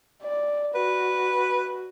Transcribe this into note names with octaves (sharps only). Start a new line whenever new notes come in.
D5
F#4 B4